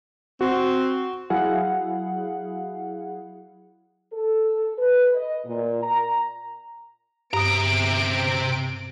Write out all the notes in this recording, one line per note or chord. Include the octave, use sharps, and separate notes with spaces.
C4 F#4
F#3 E4 G#4 F5 F#5
A4
B4
D#5
A#2
A#5
G2 C3 A#5 D#6 D7